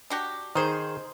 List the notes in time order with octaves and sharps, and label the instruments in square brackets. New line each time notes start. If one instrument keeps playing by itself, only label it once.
[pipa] D4 F#4 G4
[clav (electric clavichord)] D#3 G#4 [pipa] D#4 C5